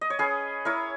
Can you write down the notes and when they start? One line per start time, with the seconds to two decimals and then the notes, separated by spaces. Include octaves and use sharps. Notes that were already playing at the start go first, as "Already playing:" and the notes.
0.01 D#5
0.10 C#5
0.19 C#4 G#4 B4
0.65 E4 A#4 C#5